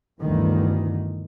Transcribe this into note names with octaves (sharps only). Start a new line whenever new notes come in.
G1 D2 G2 D#3 E3